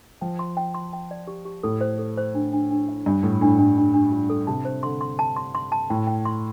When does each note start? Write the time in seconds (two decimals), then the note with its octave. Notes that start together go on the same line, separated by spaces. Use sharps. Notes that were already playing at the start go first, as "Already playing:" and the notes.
0.21 F3 G5
0.39 C6
0.57 G5
0.74 C6
0.93 G5
1.11 D5
1.27 G4
1.45 G4
1.63 A2 A4
1.81 C5
1.99 A4
2.17 C5
2.35 D4
2.53 D4
2.71 D4
2.89 F5
3.06 G2 D4
3.23 A2 A4
3.41 A2 D4
3.59 A2 D4
3.77 D4
3.94 D4
4.12 F4
4.30 A4
4.47 C3 A5
4.65 C5
4.83 D3 C6
5.01 C6
5.19 A5
5.36 C6
5.55 C6
5.72 A5
5.90 A2 G5
6.07 G5
6.25 C6